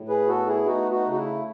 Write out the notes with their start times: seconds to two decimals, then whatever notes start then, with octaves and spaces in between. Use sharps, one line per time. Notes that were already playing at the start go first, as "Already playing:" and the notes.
Already playing: A2
0.08 G#4 B4
0.27 B3 F#4 A4
0.47 E4 G#4
0.66 A3 D#4 F#4
0.91 D#4 F#4
1.05 C#3
1.12 F#4
1.17 E4